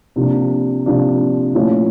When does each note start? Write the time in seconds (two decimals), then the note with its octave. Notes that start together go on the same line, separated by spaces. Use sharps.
0.16 C3 F3 A#3 D4
0.86 C3 F3 A#3 D4
1.55 A#2 F3 A3 C#4 E4